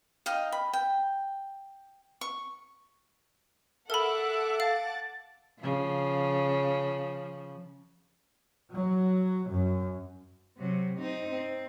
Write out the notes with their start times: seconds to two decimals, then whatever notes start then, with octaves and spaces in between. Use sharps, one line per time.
0.26 D#4 D#5 F5 G5
0.52 B5
0.73 G5
2.21 C#6
3.90 A4 A#4 E5 F#5 A5 B5 D6
4.60 F5 A6
5.60 C#3 F3
8.72 F#3
9.50 F#2
10.57 C3 F#3
10.99 C4 D#4
11.30 C4